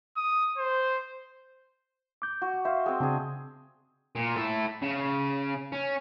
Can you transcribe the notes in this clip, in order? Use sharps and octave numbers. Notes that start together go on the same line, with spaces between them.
D#6
C5
D6 G6
F#4
C5 E5 F5
G#3 C4
C#3 C4 D4 G#4
A#2
E4 A4
C#3
C#4